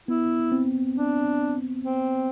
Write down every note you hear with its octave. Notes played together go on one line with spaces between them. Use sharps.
B3 E4
C4
D4
C4